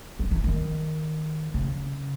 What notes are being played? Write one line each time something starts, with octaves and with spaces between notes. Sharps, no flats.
F#3
E3
D#3
C#3